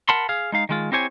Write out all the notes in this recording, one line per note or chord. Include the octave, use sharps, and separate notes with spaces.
A#4 F#5 A5 B5 C6
G#4 F5
G#3 D#4 F5
D#3 G#3 F4
C4 E4 G4 C5 C#5 G#5